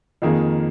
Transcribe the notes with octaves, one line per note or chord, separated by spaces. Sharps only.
F2 D#3 A#3 G#4